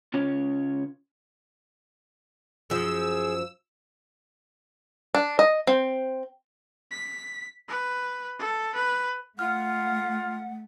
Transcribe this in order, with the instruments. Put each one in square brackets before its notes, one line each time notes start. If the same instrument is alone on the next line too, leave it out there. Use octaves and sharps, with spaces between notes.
[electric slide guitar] C#3 C#4 F4 C#5
[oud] F#2 F3 [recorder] G#4 [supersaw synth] E6
[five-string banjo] D4
D#5
C4
[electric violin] B6
B4
A4
B4
[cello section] A3 [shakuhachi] F4 [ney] F#5 [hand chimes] F6